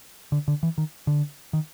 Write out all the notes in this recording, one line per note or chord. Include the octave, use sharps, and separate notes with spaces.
D3
D3
E3
D#3
D3
D#3